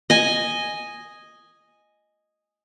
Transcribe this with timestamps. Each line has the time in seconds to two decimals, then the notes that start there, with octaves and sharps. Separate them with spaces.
0.10 D#5 G#5